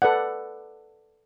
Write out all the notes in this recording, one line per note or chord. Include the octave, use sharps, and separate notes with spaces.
A4 B4 D5 F#5